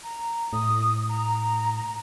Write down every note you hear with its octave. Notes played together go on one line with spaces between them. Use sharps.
A#5
A2 D#6
A#5